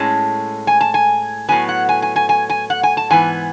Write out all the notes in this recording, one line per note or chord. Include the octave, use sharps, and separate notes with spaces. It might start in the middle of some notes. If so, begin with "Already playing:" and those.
Already playing: A2 G#3 C#4 A5
G#5
A5
G#5
A2 F#3 B3 G#5
F#5
G#5
G#5
G#5
G#5
G#5
F#5
G#5
A5
G#2 E3 B3 G#5